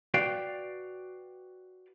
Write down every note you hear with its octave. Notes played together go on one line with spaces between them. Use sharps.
F#4 B4 D5 F5 G5